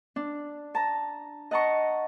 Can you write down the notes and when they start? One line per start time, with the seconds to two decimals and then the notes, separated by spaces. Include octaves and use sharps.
0.16 D4
0.75 A5 A#5
1.51 D#5 F#5 A5 A#5 C#6